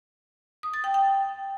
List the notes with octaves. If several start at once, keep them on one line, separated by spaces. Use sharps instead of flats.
D#6
A6
G5
G5